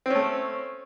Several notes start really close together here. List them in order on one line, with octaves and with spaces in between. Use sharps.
C4 C#4 A3